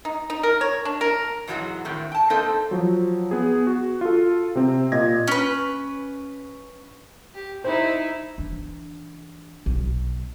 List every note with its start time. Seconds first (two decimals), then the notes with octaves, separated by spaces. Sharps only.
0.05 D#4
0.30 D#4
0.43 A#4
0.61 C#5
0.85 D4
1.01 A#4
1.47 G#2 E3 F#3 C#4 F#4 G#4
1.85 A2 D#3 C4
2.12 G5 A5
2.30 A#3 C4 D#4 A4 A#4 C5
2.71 F3 F#3
3.31 B3 G#4
3.67 F#4
4.01 F4 A4
4.55 C3 C4
4.92 A#2 D#5 G#6 A#6
5.28 C#4 B4
7.34 G4
7.64 D#4 E4 C5 B5
8.38 E3 D4
9.66 B1